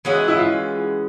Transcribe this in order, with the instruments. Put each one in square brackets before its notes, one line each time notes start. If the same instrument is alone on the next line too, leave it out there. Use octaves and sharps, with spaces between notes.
[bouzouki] E3 G#3 C#4 F#4
[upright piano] E4
F4